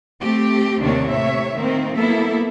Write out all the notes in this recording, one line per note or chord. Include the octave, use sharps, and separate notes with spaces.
A3 C4 G4
D#2 C3 D#3 C4 D4 C#5
A2 C3 C#5 E5
D#3 A#3 C4
F#3 A#3 B3 E4 A4 E5